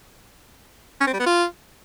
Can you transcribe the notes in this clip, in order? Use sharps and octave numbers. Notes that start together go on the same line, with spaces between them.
C#4
C4
G3
B3
F4